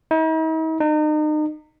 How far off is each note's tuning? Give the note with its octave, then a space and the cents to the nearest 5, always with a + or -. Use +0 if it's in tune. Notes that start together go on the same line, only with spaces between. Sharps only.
D#4 +45
D#4 -35